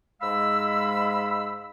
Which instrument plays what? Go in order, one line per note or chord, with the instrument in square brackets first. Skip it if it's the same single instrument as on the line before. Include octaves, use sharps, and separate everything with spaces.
[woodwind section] G#2 G#3 F5 B5 E6